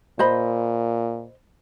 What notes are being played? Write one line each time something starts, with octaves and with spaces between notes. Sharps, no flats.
A#2 C5 D#5 B5